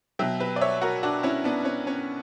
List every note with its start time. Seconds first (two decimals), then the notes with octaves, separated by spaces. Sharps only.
0.19 B2 F#3 E5 G5
0.40 G4 B4
0.56 D5
0.61 C#5 E5
0.82 F#4 A#4
1.03 D4 F#4
1.23 C#4 E4
1.44 B3 D4
1.65 C#4
1.87 C#4